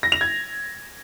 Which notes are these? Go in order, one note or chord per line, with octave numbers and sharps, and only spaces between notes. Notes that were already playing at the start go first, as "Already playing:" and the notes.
A#6
F7
G#6